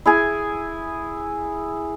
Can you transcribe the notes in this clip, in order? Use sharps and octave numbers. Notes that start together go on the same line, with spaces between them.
E4 G#4 G#5